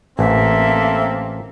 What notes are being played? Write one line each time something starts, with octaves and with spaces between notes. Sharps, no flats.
A1 A#3 C4 A4 E5